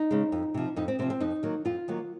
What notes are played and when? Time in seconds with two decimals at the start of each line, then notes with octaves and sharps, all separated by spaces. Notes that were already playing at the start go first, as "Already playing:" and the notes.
Already playing: D#4
0.11 C#3 G#3
0.32 F2
0.54 C3 F3
0.76 F2 D#4
0.88 C4
0.99 C3 F3 C4
1.10 C4
1.20 F2 D#4
1.43 D#3 F#3 A#3
1.65 F2 F4
1.88 D#3 F#3 A#3